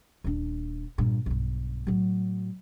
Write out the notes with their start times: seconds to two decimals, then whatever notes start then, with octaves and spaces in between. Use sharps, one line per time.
0.24 D#1 D4
0.98 G2 A#2
1.26 B1 G2
1.87 A2 F#3